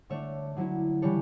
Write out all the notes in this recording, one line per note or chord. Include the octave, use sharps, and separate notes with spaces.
D3 A3 D4 C#5 E5
D3 F#3 C#4 E4
C#3 E3 G3 D4 A4 C#5